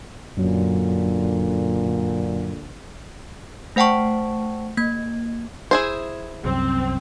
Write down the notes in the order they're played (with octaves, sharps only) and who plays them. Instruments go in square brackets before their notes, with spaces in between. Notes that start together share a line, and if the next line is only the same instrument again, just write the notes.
[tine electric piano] F#2 F#3 [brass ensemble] A#2 D3
[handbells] A3 C5 F#5 G5 A5 C#6
A#3 G#6
[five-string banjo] E4 G#4 C5
[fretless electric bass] C2 F#2 [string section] C4